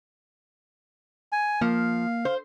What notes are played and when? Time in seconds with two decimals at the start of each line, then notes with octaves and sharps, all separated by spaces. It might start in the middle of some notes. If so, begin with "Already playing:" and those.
1.32 G#5
1.61 F3 A#3 F5
2.25 C5